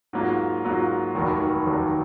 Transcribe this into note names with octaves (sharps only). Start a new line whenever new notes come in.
G#2 F#3 A#3 F4
G#2 F#3 A#3 F4
F1 D#2 D#3 F#3
F1 D#2 D#3 F#3